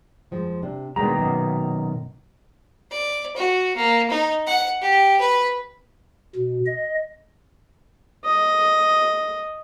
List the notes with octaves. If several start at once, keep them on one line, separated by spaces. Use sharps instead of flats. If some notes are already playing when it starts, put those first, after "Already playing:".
F2 F3 G#3
C3 D4
B2 D#3 G#3 A#3 D4 A#5
F#2 A#2 A3
D5
F#4
A#3
D#4
F#5
G4
B4
B2
D#5
D#5